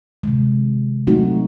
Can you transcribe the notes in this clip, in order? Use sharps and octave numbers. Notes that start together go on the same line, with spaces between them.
C3 D#3 G#3
F#3 A3 C4 D#4 F#4